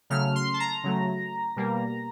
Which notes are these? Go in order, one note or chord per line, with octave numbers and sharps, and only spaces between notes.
C#3 F#3 A3 F6
C6
A5
A#5
C#3 F#3 A3
B2 G3 A#3